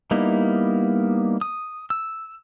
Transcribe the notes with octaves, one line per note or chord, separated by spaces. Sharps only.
G3 A#3 B3 D#4 E4
D#6
E6